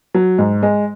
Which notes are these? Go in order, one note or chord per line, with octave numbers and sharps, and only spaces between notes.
F#3
G#2
G#3